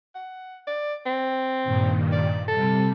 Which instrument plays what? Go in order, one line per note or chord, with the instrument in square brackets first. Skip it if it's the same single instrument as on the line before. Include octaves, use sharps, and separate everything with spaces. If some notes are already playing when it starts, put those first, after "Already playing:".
[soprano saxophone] F#5
D5
C4
[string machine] G2 A#2 D#3
[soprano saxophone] D5
[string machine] C3 G3 [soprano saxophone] A4